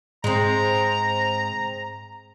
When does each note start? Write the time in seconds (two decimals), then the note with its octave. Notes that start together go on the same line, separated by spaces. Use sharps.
0.24 G#2 G#3 C4 A#5